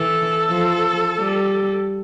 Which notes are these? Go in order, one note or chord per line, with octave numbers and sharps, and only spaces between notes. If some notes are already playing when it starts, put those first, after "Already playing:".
Already playing: E3 A4
F3
G3